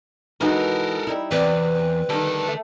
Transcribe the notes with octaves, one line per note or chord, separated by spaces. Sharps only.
E3 G#3 D#4 F#4 A4 A#4
G3 D#4 E4
E2 C3 C4 B4 D5
D2 D#3 G3 A4
A3